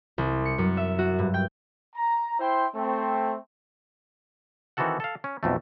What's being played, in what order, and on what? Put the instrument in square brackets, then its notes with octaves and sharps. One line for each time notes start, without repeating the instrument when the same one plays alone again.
[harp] C2
C#7
F#2
E5
F#4
G2
G5
[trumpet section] A#5
E4 C5 G5 C6
A3 C4
[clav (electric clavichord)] D#3 E3 C4 F#4 A4 F#5
A4 F5
C#4
B1 F2 A3